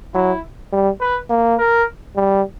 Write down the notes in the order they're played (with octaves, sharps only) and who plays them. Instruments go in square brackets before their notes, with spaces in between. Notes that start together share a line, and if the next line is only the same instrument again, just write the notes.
[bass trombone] F#3 [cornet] E4
[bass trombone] G3
[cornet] B4
[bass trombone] A#3
[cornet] A#4
[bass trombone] G3